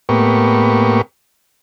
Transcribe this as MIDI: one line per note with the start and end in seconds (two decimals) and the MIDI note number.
0.09 1.01 45
0.09 1.01 58
0.09 1.01 59
0.09 1.01 67
0.09 1.01 85